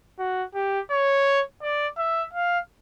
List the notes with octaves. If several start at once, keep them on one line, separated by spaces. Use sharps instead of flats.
F#4
G4
C#5
D5
E5
F5